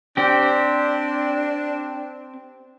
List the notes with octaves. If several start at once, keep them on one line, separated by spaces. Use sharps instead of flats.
C4 D4 G4